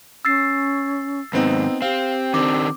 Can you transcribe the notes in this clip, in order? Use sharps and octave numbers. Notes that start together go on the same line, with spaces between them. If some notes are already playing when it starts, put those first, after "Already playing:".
C#4 E6 A6 C7
D#2 G#2 B3 C4 D#4
C4 G4 F5
D#3 C4 D4 D6